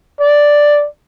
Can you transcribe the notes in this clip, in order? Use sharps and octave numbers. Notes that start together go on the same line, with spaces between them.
D5